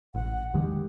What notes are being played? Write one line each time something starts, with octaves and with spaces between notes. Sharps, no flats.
A1 F#5
E2 D#3 G#3 G4